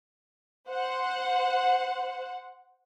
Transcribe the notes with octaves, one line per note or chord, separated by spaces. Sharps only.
C5 F#5